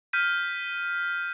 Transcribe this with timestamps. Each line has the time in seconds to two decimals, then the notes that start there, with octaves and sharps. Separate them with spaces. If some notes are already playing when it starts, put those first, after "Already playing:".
0.13 F6 G6 B6 D#7